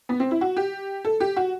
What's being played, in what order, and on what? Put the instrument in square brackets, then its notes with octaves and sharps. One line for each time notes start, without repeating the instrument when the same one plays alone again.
[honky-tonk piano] B3
C4
E4
F#4
G4
A4
G4
F#4